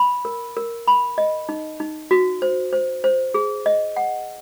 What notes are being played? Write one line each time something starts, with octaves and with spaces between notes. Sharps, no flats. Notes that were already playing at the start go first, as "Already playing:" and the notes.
Already playing: B5
A#4
A#4
B5
D#5
D#4
D#4
F#4
C5
C5
C5
G#4
D#5
F#5